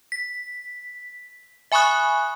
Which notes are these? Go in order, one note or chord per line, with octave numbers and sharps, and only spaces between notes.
B6
E5 G#5 B5 C#6 D#6 F#6